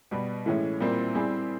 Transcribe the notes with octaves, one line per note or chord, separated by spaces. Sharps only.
B2 G3 B3
A2 E3 G#3 C#4
A#2 G3 C4 E4
G3 C4 E4 G#4